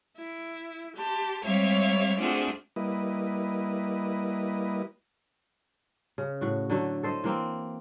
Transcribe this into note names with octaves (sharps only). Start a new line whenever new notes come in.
E4
G4 A5 C6
G3 G#3 C4 C#5 E5 F5
A3 C4 D4 F4 F#4 G#4
G3 A#3 E4 B4 D#5
C#3
A2 F#4
D3 F#3 A3
A4 C5 D#5
E3 A#3 C4